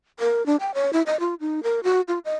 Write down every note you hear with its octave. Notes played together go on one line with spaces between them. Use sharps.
A#4
D4
G5
C#5
E4
D#5
F4
D#4
A#4
F#4
F4
D#5